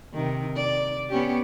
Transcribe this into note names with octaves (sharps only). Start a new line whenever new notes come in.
C3 D#3
D5
B3 C#4 G4